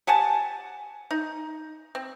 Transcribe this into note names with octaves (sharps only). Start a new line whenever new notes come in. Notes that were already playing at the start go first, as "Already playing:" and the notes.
G4 F#5 G#5 A5
D#4
C4